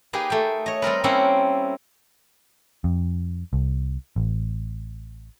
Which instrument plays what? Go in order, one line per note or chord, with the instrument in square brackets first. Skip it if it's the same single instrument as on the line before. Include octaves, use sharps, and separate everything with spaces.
[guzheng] A#3 D#4 G4 G#4 B4
A3 G#4 G5
C#5 D#5
G3 C4 A#4 B4
G3 A#3 C4 C#4 E4 F#5
[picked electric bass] F2
C2
A1